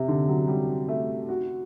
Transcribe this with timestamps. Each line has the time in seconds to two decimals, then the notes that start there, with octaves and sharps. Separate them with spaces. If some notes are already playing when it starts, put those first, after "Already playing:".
Already playing: C3
0.08 D3
0.28 F#3
0.48 G3
0.88 A3
1.29 F#4